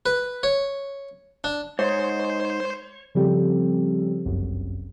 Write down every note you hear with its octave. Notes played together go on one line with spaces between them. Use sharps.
B4
C#5
D4
G#2 C5 C#5
C#3 F3 G3 C4 G4 A4
G1 C2 F#2